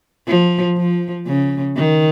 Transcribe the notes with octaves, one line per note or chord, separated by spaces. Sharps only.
F3
F3
C#3
D#3